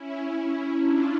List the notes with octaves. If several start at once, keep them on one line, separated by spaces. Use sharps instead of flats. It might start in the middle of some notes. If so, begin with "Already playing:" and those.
Already playing: C#4 E4
D4 F4